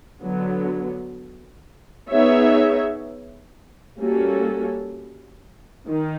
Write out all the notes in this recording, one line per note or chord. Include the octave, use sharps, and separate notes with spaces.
D3 F#3 B3
B3 D#4 G#4 C#5 E5
G3 A#3 C#4 F#4 A4
D#3